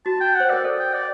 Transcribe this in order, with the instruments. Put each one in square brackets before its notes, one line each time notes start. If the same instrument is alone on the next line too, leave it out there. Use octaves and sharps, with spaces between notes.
[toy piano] F#4 [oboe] A5
[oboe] G5
[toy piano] C5 [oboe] F#5
[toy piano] A#4 [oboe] D5
[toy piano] A4
[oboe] G5
D5